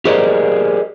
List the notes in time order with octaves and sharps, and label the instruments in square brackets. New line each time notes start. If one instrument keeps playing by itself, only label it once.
[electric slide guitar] G4 G#4 A#4 C5 D5 D#5